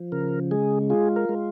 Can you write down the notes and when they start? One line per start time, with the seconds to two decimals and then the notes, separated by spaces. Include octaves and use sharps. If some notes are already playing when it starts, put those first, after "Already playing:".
Already playing: F3
0.12 C#3 A#4
0.51 G#3 G#4
0.90 F4 G#4
1.16 A#4
1.29 G#3